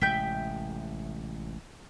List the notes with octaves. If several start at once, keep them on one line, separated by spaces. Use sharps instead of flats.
A1 C3 G#3 E5 G5 G6